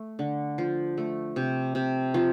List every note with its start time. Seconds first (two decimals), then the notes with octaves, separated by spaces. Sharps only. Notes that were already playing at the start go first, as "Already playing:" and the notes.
Already playing: A3
0.19 D3
0.58 F3
0.97 A3
1.36 C3
1.75 C3
2.14 F3